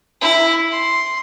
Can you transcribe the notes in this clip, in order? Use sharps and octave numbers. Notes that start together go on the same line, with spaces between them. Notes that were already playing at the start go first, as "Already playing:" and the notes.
E4
C6